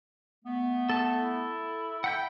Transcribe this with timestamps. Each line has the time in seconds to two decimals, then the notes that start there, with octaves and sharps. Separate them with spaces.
0.45 A3 B3
0.89 A4 A5
1.22 E4
2.04 E5 F#5 G5 B5 G6